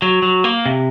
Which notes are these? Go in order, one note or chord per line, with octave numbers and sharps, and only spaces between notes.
F#3
F#3
A#3
C3